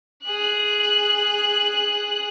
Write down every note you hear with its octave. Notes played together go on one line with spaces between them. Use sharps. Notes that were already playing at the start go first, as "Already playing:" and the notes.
G#4 F#6